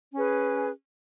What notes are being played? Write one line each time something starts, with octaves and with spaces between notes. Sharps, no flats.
C#4 G#4 B4